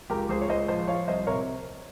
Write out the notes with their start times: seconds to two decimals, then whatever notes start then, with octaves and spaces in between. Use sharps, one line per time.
0.10 C#2 G4 A#4
0.29 C#2 G#4 C5
0.41 C#5
0.49 C#2 C5 D#5
0.68 F3 C5 D#5
0.87 F3 C#5 F5
1.07 C2 C5 D#5
1.27 C3 A#4 C#5